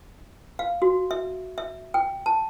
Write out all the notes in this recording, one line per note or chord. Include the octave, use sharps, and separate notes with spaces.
F5
F#4
E5
E5
G5
A5